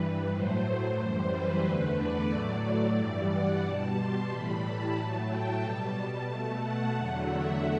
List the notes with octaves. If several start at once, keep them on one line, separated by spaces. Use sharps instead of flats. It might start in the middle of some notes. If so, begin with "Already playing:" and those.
Already playing: G2 E3 G3 B4
A2 F#3 A3 C5
F#2 E3 G3
B4
E2 D3 A3 B4
D5
A2 F#3 A3
D5
G2 E3 G3
F#5
B2 G3 A5
C6
A2 E3 G3 B5
A5
A2 F#3 A3
G5
B2 G3 A5
B2 A3
F#5
E2 D3 F#3 A3
E5